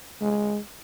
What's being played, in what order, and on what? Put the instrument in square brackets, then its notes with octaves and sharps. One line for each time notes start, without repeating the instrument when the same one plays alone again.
[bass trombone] G#3